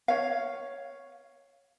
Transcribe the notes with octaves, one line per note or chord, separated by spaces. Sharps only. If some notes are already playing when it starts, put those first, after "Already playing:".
C#5 F5